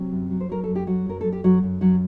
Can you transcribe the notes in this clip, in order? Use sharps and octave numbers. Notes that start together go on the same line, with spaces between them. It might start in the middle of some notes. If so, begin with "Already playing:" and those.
Already playing: C3 F#3 C4
F#2
F#3
C5
F#3 A#4
F#2 A4
G4
F#2 F#3 F#4
F#2 A#4
F#2 A4
G4
F#2 F#3 F#4
F#2
F#2 F#3 F#4